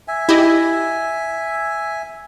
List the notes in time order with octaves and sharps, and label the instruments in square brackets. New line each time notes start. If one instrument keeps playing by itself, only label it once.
[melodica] E5 G#5
[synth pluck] E4 G4 D#5